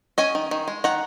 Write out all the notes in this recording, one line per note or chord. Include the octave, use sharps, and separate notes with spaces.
C#4 D#5 G#5
D#3
D#3
G#3
D#3 F#5 A#5